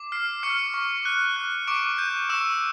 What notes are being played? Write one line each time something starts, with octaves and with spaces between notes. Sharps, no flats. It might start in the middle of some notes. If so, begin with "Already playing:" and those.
Already playing: D6
F6 C7
C#6 F6 C#7
C#6
F#6
F#6
C#6 D6 D7
G6
C#6 E6 E7